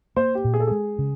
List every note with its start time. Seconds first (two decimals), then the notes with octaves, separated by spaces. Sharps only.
0.16 A#3 C5
0.35 G4
0.44 A#2
0.54 G#4
0.60 A4
0.67 G#3 G#4
0.99 C#3